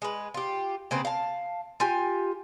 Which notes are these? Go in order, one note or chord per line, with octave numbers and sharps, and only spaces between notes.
G#3 B4
F4 G4
C#3 A#3 C4 B4
F5 A5
F4 G4 G#5